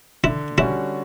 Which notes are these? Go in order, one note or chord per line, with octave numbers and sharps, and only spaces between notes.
D3 E4
G3 C#4 E4 F#4